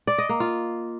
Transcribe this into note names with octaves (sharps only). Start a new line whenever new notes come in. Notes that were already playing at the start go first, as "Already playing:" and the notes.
D5
D#5
A#3
F4